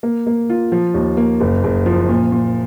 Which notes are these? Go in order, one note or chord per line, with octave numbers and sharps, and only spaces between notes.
A#3
A#3
F4
F3
D#2
A#3
F#1
F#1
F3
A#2
A#2